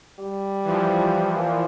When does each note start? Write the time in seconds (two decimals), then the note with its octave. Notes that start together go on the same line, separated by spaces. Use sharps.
0.19 G3
0.64 E3 F3
1.34 A#2